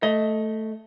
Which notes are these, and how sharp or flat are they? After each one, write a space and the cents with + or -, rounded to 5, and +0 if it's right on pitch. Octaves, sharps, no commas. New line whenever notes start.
A3 +0 D#5 +20